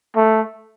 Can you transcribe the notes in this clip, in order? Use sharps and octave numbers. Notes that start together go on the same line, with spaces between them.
A3